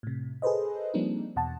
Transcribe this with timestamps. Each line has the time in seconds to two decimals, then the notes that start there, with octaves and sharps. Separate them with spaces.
0.03 A2 C3
0.42 G#4 A4 B4 C5 D#5
0.94 F3 G3 A#3 C4 D4 D#4
1.36 E2 B2 F#5 A5